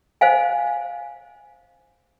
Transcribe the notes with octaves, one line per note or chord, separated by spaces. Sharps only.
C5 D#5 F5 G#5